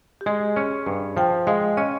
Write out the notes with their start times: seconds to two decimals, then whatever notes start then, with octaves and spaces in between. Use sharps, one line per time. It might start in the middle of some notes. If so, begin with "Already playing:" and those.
0.21 G4
0.26 G#3 G#4
0.56 C#4
0.86 G2
1.17 F3 G5
1.47 G#3 F5
1.77 C#4 D#5